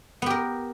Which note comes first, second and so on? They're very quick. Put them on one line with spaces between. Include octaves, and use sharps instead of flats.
B3 G4 A#4